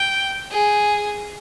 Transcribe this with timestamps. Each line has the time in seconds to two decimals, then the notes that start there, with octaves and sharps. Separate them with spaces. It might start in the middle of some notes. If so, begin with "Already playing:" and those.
Already playing: G5
0.50 G#4